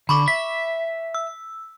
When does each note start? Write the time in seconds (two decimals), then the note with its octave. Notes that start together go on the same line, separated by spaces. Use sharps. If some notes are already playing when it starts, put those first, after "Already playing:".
0.09 D3 B5 C#6 D6
0.28 E5 B6
1.14 E6